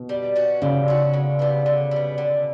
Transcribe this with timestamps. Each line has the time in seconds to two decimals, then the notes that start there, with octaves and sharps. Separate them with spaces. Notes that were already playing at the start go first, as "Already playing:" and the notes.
Already playing: B2
0.09 G3
0.36 C#4 F#4
0.62 C#3 G3
0.88 C#4 F#4
1.13 D3
1.39 G3 B3
1.66 D3
1.91 G3 B3
2.18 D3